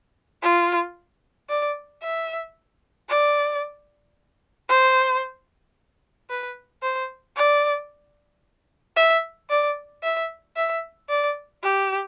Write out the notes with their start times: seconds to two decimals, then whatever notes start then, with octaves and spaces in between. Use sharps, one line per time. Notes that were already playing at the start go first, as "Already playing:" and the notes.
0.43 F4
1.49 D5
2.03 E5
3.09 D5
4.69 C5
6.29 B4
6.82 C5
7.37 D5
8.96 E5
9.50 D5
10.03 E5
10.56 E5
11.10 D5
11.63 G4